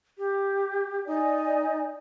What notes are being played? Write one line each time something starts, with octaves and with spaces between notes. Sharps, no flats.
G4
D#4 D5 G#5